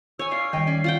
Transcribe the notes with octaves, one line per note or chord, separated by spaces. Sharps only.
C#5 G#5 E6
F4 D5 C7
D#3 G3 D#5 G5
C#4 D5
F4 F#5 G5